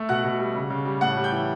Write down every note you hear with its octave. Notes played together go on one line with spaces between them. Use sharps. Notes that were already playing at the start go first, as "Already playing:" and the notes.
Already playing: A3
B2 F#5 F#6
B2
G3
C#3
C#3
G3
A2 F#5 F#6
G3
G5 G6
E3